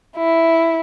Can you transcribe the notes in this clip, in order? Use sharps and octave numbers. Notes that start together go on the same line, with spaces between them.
E4